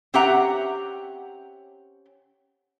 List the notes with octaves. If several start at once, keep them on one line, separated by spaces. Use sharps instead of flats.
C4 C#4 G4 E5 F#5 A#5